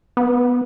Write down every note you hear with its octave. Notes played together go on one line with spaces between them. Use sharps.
B3